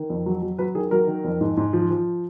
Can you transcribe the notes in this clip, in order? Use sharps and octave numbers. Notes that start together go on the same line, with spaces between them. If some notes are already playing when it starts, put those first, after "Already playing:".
Already playing: D#3
F2
F#3
F#3
F#3 B4
D#3 G#4
F#3 A#4
D#3
F2
G#2
G#2
F3
F3